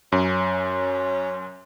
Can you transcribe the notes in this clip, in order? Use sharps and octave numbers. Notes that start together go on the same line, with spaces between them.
F#2 C#4